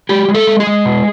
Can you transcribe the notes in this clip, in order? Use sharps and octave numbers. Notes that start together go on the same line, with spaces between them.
G#3 G4
G#3
A4
G#3
G#4
G#3
B2